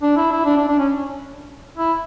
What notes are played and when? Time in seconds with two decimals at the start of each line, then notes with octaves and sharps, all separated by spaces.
0.02 D4
0.17 E4
0.31 E4
0.45 D4
0.57 D4
0.68 D4
0.79 C#4
1.77 E4